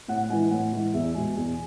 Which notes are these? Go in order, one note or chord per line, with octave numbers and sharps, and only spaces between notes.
A2 F#5
F#5
E3 G#3 G#5
A2 F#5
E3 G#3
E2 E5
B2 G#3 G#5
E2 G#5